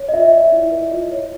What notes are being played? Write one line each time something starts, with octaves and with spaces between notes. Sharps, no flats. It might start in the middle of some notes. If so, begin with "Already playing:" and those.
Already playing: C#5
D#5
F4 E5
D5
E4
B4
F4 D#5
C#5